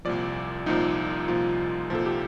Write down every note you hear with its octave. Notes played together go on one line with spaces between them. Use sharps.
C2 A#2 F3 D5
C2 A#2 F3 D#4
C2 A#2 F3 F4
C2 A#2 F3 A4
G4